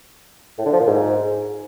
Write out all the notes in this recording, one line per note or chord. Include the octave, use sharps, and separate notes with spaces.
A2
D3
F3
A#2
G#2